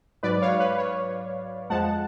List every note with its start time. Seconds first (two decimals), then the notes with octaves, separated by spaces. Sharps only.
0.23 G#2 F#3 B4 D5
0.42 C#5 F5
0.60 B4
0.78 C#5
1.70 F2 F3 G#3 F#5 A5